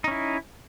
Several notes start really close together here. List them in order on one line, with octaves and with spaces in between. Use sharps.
D#4 C#4 E4